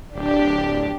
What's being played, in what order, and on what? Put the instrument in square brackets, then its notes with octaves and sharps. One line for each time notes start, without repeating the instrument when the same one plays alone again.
[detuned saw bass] D1 [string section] D4 G4